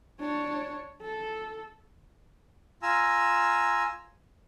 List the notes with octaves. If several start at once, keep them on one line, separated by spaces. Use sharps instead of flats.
D4 C#5
A4
F4 G#5 A#5 E6